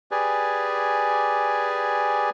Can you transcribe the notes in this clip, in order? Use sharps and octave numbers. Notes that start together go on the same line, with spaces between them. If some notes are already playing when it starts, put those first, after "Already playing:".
G4 G#4 B4 D5 G#5